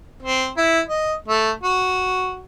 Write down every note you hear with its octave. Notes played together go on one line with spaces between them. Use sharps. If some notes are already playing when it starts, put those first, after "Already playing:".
C4
E4
D#5
A3
F#4